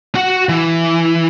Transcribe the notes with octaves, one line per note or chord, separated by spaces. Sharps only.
F#4 F#5
E3